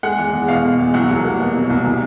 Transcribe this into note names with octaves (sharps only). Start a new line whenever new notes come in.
G#3 F#5
E2
E2
B2 F5
G#3
E2
F#3 F#5
C2
A#3
B2
F#3
C2
E3